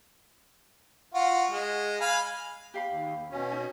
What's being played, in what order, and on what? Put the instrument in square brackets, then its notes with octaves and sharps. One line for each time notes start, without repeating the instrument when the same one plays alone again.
[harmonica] F4 F#4
G#3
F5 G#5 B5
[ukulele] G4 F5 B5
[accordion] D#2
B2 C#4
[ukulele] D#4